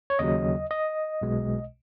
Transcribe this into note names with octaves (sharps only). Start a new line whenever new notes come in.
C#5
D#2 C#3 F#3 D#5
D#5
B1 B2 G#3